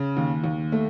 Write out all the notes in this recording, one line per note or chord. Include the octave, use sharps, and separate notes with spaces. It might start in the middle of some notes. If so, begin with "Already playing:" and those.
Already playing: C#3
D#2
D#2
A3